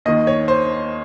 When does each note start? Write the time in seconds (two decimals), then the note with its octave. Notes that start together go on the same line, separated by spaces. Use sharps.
0.05 D#2 D#3 D#5
0.27 C#5
0.48 C5